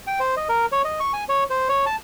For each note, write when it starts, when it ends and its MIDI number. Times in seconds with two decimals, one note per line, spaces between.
0.07 0.19 79
0.20 0.35 72
0.37 0.48 75
0.49 0.66 70
0.72 0.82 73
0.85 1.00 75
1.00 1.12 85
1.13 1.24 80
1.29 1.44 73
1.50 1.68 72
1.69 1.85 73
1.86 1.96 81